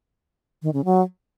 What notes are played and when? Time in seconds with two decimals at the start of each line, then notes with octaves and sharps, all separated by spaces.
0.62 D#3
0.73 C#3
0.85 F#3